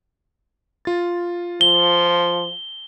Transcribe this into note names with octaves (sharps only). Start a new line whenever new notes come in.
F4 A6
F3 G7